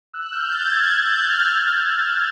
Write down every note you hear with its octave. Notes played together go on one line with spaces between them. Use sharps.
E6 F#6
F6 G6
G6 A6
F#6 G#6
A6
G#6
G6
F#6 G#6
F6 G6